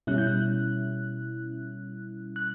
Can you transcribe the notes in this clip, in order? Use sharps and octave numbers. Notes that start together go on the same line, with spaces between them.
B2 G3 C#4 E4 F#6
G6
F#6
F#6